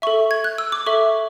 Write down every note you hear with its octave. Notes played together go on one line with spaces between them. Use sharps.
A4 E5 C#6
G#6
F#6
E6
D6
A4 E5 C#6